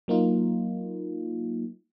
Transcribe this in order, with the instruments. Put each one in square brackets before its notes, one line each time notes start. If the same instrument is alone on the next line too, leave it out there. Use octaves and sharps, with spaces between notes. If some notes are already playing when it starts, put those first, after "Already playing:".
[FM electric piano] F#3 A#3 D#4 F4